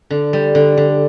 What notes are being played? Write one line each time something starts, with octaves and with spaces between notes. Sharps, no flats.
D3
G3
D3
D3